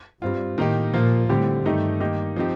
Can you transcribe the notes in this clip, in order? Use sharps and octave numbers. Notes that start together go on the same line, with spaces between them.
G2 G3 C4 F4
A2 D#3 A#3 D#4 G4
A#2 F3 A#3 F4
A2 D3 G3 C4 G4
G2 D#3 A3 D#4 G4
D#3 A#3 D#4 G4
F3 C4 D#4 G4